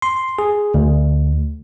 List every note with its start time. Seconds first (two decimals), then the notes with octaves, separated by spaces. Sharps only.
0.02 C6
0.39 G#4
0.74 D2